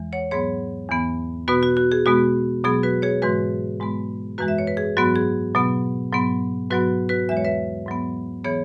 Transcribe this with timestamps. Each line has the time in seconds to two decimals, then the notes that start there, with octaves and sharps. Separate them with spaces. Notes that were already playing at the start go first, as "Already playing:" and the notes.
Already playing: E2 E3 G#3
0.12 C#5 F#5
0.31 G#2 F#3 B3 G#4 C#5
0.90 E2 E3 B3
1.48 B2 B3 F#4 B4
1.63 F#4
1.77 F#4
1.92 G#4
2.06 B2 G#3 B3 F#4
2.64 B2 F#3 B3 G#4
2.83 F#4 B4
3.02 G#4 C#5
3.22 G#2 E3 G#3 F#4 B4
3.80 G#2 G#3 B3
4.38 F#2 E3 G#3 F#4 B4
4.48 E5
4.58 C#5
4.67 B4
4.77 G#4
4.96 G#2 F#3 B3 F#4
5.15 G#4
5.55 B2 F#3 B3
6.12 G#2 F#3 B3
6.70 G#2 F#3 B3 F#4 B4
7.09 F#4 B4
7.29 E2 E3 G#3 E5
7.37 C#5
7.45 B4 E5
7.87 G#2 F#3 B3
8.45 E3 B3 G#4 C#5